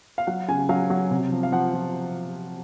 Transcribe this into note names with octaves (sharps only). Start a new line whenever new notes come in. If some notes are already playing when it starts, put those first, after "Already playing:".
F5
F#3 F#5
C#3 G#5
F#3 F5
F#3
C3
F3
F5
F3 F#5
F3